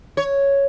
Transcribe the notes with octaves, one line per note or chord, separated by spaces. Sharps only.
C#5